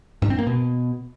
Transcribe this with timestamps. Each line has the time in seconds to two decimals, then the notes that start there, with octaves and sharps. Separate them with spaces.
0.22 G2
0.30 C4
0.39 A#3
0.47 B2